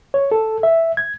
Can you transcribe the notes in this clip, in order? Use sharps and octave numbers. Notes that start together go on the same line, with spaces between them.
C#5
A4
E5
G#6